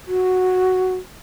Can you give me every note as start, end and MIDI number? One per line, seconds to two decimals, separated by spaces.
0.07 0.95 66